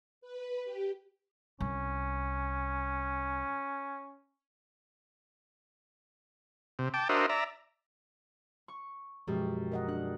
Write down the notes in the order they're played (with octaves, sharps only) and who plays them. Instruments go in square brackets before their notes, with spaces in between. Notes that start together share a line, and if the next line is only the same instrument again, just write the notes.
[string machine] B4
G4
[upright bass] C2 [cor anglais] C#4
[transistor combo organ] C3
G5 A5 D6
D4 F#4 A#4 C5 D#5 E5
D5 E5 A#5
[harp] C#6
[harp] F#2 B2 [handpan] F3 G#3 G4
[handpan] A#4 D#5 F#5
[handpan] D4 [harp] F#6